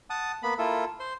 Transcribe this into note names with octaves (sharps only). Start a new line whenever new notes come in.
F#5 A5 D#6
A#3 B3 B5
A#3 E4 F4 A4
C5 C6